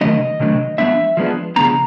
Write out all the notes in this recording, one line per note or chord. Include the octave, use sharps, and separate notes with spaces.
C3 D#3 F#3 A3 D4 D#5
C3 D#3 F#3 A3 D4
F3 G#3 B3 D4 E5
F3 G#3 B3 D4
C#3 F3 G#3 B3 D4 A#5